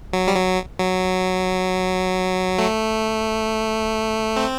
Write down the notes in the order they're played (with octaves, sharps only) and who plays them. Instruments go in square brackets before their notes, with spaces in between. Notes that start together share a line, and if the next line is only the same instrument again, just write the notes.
[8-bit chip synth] F#3
G3
F#3
F#3
A3
C4